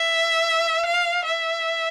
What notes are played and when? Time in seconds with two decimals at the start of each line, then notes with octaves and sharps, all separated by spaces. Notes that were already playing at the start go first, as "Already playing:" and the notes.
Already playing: E5
0.86 F5
1.25 E5